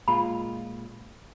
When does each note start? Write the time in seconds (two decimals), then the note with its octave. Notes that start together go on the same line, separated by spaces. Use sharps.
0.08 A#2 G#3 F4 B5